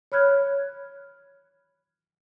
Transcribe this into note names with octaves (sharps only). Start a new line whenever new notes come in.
C#5 B5 F6 F#6 G#6